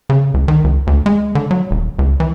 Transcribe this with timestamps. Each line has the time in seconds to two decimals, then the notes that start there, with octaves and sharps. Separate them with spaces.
0.10 C#3
0.34 C#2
0.48 D#3
0.64 C#2
0.87 D2
1.06 G#3
1.35 D3
1.51 F#3
1.71 D#1
1.99 C#2
2.20 E3